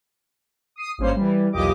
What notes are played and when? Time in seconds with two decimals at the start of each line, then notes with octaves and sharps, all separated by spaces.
0.76 D#6 C7 D#7
0.98 G#1 G2 A#3 C#4 C5 C7
1.16 E3 G3
1.52 B1 E2 A#2 G4 D#5 D6